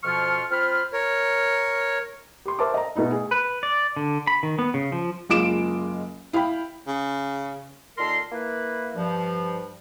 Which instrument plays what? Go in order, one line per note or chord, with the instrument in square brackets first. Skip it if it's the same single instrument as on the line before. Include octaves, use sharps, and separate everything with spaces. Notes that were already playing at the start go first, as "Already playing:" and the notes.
[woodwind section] F2 B2 F3 F4 C#6 F6
C4 F4 C5 B5 F6
[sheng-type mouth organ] A#4 C#5
[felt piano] G4 C6
A#4 C5 E5 A5 C6 D6
D#5 A#5
B2 A3 D#4 E4
G#4
[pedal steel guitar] B4
D5
D3
B5
D#3
B3
C#3
F3
[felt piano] F#1 G#3 F4 D6 D7 E7
E4 F5 G5 B5
[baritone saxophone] C#3
[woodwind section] A#2 D#3 A4 A#4 C6
A#3 E4 B4
G2 F3